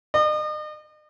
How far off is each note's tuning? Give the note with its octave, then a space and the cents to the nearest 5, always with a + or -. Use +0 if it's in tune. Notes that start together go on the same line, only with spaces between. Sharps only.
D#5 -40